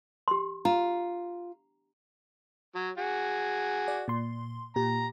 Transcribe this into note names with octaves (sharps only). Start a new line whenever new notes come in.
G4 C6
F4 A#5
F#3
F#4 G#4
D5
A#2 C6
A#2 G4 A#5